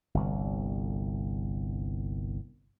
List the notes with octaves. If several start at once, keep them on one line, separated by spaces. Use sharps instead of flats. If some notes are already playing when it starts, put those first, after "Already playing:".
G1 C2